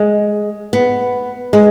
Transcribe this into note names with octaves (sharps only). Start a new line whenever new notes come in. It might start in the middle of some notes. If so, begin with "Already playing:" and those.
Already playing: G#3
B3
G#3